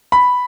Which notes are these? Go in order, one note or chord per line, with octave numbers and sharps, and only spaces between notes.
B5